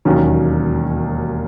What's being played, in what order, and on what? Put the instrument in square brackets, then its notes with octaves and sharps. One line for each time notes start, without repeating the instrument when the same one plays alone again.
[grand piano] E1 D#2 D#3 F#3 C#4